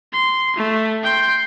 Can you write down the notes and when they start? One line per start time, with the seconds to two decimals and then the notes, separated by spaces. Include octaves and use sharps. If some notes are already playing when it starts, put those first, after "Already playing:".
0.13 C6
0.56 A3
1.04 G5 C6